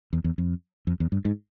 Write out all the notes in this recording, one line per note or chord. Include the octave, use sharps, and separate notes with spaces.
E2
E2
F2
F2
E2
G2
G#2